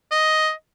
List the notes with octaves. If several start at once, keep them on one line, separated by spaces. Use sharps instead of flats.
D#5